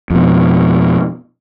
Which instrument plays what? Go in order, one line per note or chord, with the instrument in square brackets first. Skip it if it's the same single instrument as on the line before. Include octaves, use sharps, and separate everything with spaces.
[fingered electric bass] F2 B2